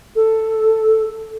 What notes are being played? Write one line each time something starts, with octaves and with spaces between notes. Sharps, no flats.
A4